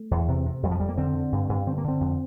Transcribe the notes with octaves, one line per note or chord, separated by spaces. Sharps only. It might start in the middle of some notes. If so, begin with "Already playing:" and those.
Already playing: A3
E2
C3
C3
F2 G3
F3
F2 G3
A#3
D3 C4
D3
G2
G2
D3 C4
A#3
D3 C4
F2